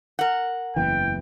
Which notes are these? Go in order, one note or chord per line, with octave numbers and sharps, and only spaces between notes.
A#4 F#5
F#1 E2 E3 G5